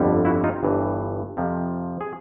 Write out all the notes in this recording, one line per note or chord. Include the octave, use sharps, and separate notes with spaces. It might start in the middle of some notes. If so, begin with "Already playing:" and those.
Already playing: G1 F2 D3 G3
E4 F#4
D#4 F4
G1 G2 E3
F2 C3 F3
G#4